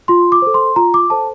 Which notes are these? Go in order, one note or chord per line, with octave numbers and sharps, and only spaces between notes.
F4 C6
D6
A4 C5
C6
F4 A#5
D6
A4 C5 A5